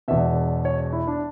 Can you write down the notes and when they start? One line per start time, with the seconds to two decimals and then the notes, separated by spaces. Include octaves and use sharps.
0.08 E1 E2 B2 E5
0.65 C#5
0.93 E4
1.07 D4